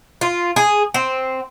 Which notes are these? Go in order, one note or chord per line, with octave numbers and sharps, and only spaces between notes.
F4
G#4
C4